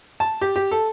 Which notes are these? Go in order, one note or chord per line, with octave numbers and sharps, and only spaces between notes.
A5
G4
G4
A4